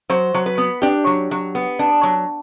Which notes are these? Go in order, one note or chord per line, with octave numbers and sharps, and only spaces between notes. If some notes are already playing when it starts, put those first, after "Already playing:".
F#3 C5
F#3
B4
B3
D4 G4
F#3
F#3
B3
D4
F#3